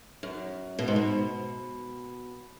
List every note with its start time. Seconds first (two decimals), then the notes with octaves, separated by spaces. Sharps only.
0.23 F#2
0.79 B2
0.88 G#2
0.96 B2